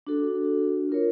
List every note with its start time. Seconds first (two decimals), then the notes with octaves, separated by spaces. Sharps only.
0.07 D4 F#4 A4
0.89 F4 A#4 C#5